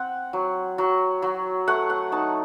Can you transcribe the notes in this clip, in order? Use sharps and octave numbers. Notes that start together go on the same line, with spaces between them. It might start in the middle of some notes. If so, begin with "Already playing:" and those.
Already playing: C4 F#5
F#3
F#3
F#3
A3 F#5
F#5
D#4 A5